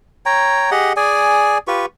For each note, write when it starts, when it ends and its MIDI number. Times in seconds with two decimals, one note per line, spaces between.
0.26 0.70 73
0.26 0.70 79
0.26 0.70 82
0.71 0.93 67
0.71 0.93 68
0.71 0.93 75
0.71 0.93 78
0.97 1.58 68
0.97 1.58 74
0.97 1.58 80
1.67 1.86 65
1.67 1.86 67
1.67 1.86 71
1.67 1.86 85